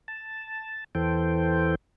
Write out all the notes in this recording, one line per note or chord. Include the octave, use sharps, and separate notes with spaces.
A5
E2 E3 A4 C5 G5